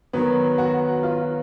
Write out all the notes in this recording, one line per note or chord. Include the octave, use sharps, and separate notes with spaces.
D#3 F#3 B3
F#4
F4